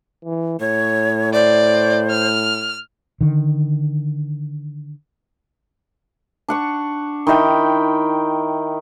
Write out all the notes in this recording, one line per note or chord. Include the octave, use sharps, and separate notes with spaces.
E3
A2 C#5
C5 D5
F6
D3 D#3
D4 F#5 C#6
D#3 E4 D#5 G5